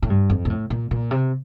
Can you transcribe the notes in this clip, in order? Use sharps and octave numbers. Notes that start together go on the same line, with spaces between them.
A2
G2
F2
A#2
A2
A#2
A#2
C3